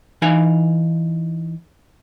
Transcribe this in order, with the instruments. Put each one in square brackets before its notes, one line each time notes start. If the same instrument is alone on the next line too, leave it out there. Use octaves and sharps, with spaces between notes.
[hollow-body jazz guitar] E3 D#4 F5 G#5